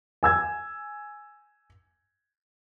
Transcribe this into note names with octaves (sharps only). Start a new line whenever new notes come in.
G#5 E6 G#6